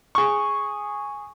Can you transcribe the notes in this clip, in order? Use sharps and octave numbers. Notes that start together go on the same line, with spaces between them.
G#4 C#6